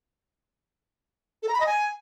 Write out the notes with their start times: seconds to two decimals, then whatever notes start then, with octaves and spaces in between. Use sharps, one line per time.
1.43 A4
1.49 A#5
1.54 B5
1.60 D#5
1.66 G#5